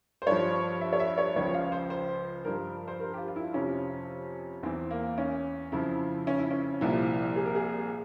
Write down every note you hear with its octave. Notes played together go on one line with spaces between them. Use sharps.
C5
G2 F3 C#5
E5
C#5
E5
C#5
C#2 C#3 F3 C#5
F5
C5
C5
G2 F3 A#4
C5
A#4
G4
F4
F4
E4
F2 C3 F3 C#4
E2 E3 C4
A#3
C#4
F2 C#3 F3 E4
C#4
E4
C#4
C2 A#2 F3 E4
G#4
A#4
G#4